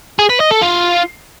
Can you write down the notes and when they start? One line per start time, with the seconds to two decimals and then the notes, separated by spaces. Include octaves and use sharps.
0.19 G#4
0.30 B4
0.40 D#5
0.51 A4
0.62 F4